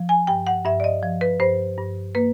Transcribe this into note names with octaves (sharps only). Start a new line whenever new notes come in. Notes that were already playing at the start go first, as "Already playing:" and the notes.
Already playing: F3
G#5
G2 G5
F#5
G2 E5
D5
D#5
F3
B4
G2 C5
G2
A#3 B4